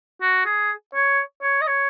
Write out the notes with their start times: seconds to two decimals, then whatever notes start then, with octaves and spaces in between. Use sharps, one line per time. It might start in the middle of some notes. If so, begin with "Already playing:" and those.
0.22 F#4
0.46 G#4
0.95 C#5
1.42 C#5
1.61 D#5
1.67 C#5